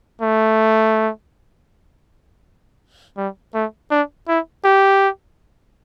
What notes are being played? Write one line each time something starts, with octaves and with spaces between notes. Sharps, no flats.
A3
G3
A3
D4
E4
G4